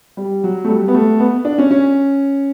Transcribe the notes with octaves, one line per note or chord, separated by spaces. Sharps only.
G3
F#3
A3
G3
B3
A3
B3
D4
C#4
C#4